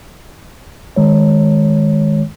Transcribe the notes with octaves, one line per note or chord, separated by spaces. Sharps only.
D#3 G#3 C#5